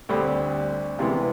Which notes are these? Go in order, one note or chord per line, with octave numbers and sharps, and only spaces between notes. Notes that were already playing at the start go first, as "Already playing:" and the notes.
D2 D3 G3 C4
C3 E3 G#3 B3